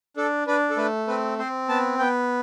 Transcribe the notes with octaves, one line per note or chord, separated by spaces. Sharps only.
D4 A4
D4 B4
A4
A3 B4
C4 B4
C4 C5
B3 A5
B3 G5